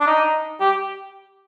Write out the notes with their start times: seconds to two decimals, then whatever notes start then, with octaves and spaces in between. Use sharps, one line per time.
0.01 D4
0.07 D#4
0.60 G4